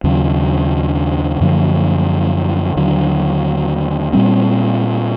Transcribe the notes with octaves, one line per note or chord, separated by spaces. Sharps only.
D#2 C#3 F#3
F#2 D3 F3 A3
D#2 D3 F#3
A#2 G3 C4